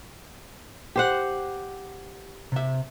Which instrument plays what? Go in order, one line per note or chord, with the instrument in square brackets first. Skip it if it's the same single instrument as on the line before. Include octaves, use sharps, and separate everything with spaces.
[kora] G4 C5 F#5
[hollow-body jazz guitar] C3 E5